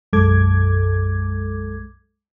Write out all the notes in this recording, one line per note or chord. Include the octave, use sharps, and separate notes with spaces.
B1 F#2 G#3 A4 D6 G#6